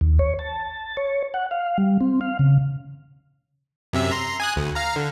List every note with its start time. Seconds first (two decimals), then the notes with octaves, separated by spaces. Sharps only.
0.01 D#2
0.19 C#5
0.39 A5
0.97 C#5
1.34 F#5
1.51 F5
1.78 G3
2.01 C4
2.21 F5
2.39 C#3
3.93 F#2 C3 E5
4.11 A#5 C6
4.40 G#5 D#6 F#6
4.56 D2
4.75 F5 A#5
4.96 D3